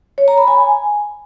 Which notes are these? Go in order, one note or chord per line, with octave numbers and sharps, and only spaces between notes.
C#5
A#5
B5
G#5